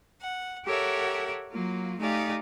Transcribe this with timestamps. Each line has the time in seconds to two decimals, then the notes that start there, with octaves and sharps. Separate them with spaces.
0.22 F#5
0.65 G4 A4 A#4 C#5 E5 F#5
1.51 F#3 A#3 F4
2.00 A3 D#4 G4 D5 F5 G#5